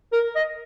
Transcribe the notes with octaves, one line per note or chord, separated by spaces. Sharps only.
A#4
D#5